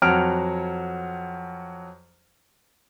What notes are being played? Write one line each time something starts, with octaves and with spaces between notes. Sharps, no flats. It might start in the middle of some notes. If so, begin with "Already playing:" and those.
F2 F#3 F6 D7